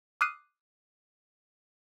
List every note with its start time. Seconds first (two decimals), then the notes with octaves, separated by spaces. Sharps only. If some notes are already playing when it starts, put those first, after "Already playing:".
0.21 D6 D#6 F6 F#6 C7 D#7